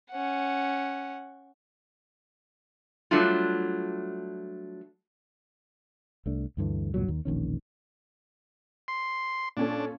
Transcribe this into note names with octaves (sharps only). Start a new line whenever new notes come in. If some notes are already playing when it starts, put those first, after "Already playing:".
C#4 F#5
F#3 G3 A3 D4 F4
C2 A3 D4
D2 G2 D3 E3
C#2 G2 A#2 F#3
D#2 D#3
E1 A#1 D#3 C#4
C6
A#2 C#4 D4 A4